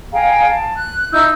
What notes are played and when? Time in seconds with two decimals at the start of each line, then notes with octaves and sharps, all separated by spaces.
0.12 G#4 F5 G5 A#5
0.48 A5
0.74 F#6
1.12 D#4 E4 E6 G6